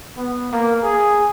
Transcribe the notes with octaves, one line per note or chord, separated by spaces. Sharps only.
B3
A#3
G#4